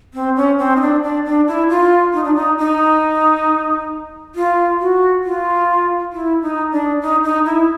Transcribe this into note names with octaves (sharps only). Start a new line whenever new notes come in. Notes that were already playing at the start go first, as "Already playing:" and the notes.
C4
C#4
C4
D#4
D4
D4
D4
E4
F4
D#4
D4
D#4
D#4
F4
F#4
F4
E4
D#4
D4
D#4
D#4
E4